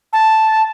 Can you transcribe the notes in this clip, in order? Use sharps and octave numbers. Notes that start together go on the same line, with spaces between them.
A5